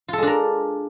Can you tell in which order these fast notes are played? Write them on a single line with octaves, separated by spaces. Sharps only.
F4 A4 G#3 D4 A#4